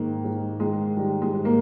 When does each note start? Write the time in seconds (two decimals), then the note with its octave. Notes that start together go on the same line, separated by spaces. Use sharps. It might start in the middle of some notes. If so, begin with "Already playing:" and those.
Already playing: G#2 D#3 A#3
0.24 G#2
0.60 D#3 G#3
0.97 D#3 G3
1.22 G#3
1.33 G#2
1.45 A#3